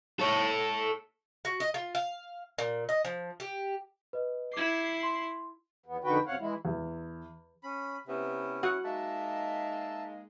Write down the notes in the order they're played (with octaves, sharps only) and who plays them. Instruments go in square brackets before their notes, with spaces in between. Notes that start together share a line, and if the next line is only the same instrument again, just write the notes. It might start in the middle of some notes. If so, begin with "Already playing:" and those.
[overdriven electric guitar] A4 C#5
[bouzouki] F#4
D#5
F4
F5
A#2
D#5
F3
G4
[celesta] B4 D#5
[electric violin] E4 C7 [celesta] D6 G#6
[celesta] C6
[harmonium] E2 B3
F2 D3 D#3 F#4 B4 G5
F#2 C3 C#5 F5 F#5
E3 G#3 E4
[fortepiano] E2
[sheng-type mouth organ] C#4 B5
[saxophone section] C3 B3 B4 [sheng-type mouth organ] C#4 E4
[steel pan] F#4 F#5
[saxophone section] G#3 A#3 D#4 [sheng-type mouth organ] E5 A5